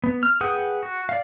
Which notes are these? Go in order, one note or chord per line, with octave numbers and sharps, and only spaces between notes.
B3
F6
G#4 B4 F#5 G5 D#6
F#4
D5 F5